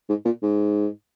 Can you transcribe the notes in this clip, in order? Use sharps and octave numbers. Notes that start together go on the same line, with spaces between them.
G#2
A#2
G#2